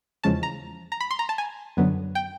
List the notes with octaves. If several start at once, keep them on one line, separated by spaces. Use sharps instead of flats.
E2 C#3 F3 G#3 C#4 A5
A#5
A#5
B5
C6
A#5
A5
G#5
F#2 D3 F#3 B3
G5